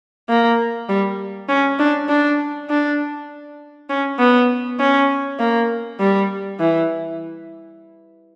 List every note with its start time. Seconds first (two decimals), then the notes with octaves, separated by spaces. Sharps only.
0.29 A#3
0.89 G3
1.49 C#4
1.79 D4
2.09 D4
2.70 D4
3.89 C#4
4.19 B3
4.79 C#4
5.40 A#3
6.00 G3
6.60 E3